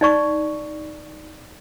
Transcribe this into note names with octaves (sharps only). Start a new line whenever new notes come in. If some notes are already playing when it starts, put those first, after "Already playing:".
D#4 D5 C#6